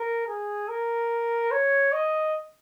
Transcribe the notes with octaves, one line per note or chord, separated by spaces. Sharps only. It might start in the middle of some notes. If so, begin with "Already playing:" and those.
Already playing: A#4
G#4
A#4
C#5
D#5